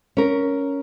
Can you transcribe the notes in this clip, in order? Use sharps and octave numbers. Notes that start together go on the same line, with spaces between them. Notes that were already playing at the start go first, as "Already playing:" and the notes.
C#4 A#4